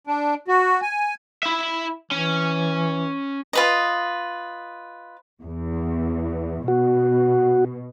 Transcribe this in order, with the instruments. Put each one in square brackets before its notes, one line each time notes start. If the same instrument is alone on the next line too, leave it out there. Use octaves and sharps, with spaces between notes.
[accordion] D4
F#4
G#5
[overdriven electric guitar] E4 E5
[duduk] E3 [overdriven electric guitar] C#4
[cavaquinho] F4 B4 D#5
[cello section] E2
[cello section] B2 [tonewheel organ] F#4